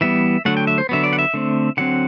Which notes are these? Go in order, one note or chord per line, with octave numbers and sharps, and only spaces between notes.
E3 G3 B3 E5
D3 F#3 A3 F#5
G5
E5
C5
D3 F#3 B3 E5
D5
F#5
E5
D3 A3 C4
D3 F#3 C4 F#5